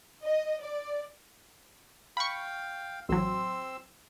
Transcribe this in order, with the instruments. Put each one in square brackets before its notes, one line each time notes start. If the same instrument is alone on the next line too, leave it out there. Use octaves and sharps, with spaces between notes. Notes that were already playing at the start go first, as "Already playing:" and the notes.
[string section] D#5
D5
[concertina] F5 G5 [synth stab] B5 C#6
[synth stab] A1 F#3 [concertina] C4 C6 E6